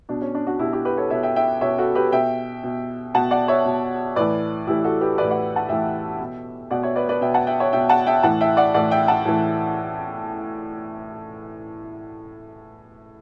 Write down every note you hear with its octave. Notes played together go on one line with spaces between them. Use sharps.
B2 D4
C#4
D4
D4 F#4
B2 E4 G4
E4 G4
G4 B4
A4 C#5
B2 C#5 E5
E5 G5
E5 G5
B2 C#5 E5
F#4 A4
G4 B4
B2 E5 G5
B2
B2 F#5 A5
D5 F#5
C#5 E5
B2
A2 E3 B4 D5
A2 E3 E4 G4
F#4 A4
G4 B4
A2 E3 B4 D5
D5 F#5
F#5 A5
A2 E3 E5 G5
B2
B2 D5 F#5
C#5 E5
B4 D5
B4 D5
B2 E5 G5
F#5 A5
E5 G5
C#5 E5
B2 E5 G5
F#5 A5
E5 G5
A2 E3 F#5 A5
E5 G5
D5 F#5
A2 E3 D5 F#5
E5 G5
F#5 A5
A2 E3